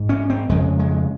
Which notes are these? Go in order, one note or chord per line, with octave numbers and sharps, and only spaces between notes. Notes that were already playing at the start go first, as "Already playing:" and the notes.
Already playing: G#2
C#4
C4
F2 C#3 G#3
G#3